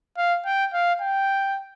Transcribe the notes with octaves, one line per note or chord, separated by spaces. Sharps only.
F5
G5
F5
G5